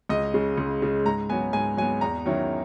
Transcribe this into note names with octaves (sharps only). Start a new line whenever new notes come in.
C#2 D#5
C#3 G#3
C#2
C#3 G#3
G#2 A#5
F#3 B3 G#5
G#2 G#5
F#3 G#5
B3
E2 A#5
D#3 F#3 C#4 E4